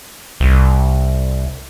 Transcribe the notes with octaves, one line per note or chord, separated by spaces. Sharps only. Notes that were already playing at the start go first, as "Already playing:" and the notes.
C2